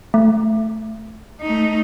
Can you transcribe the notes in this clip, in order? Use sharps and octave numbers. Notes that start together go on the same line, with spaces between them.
A3
A3 D#4